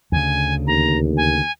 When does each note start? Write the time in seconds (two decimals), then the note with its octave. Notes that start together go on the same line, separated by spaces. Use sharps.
0.12 D2 C#3 G#5
0.67 D#2 A#5
1.17 G#5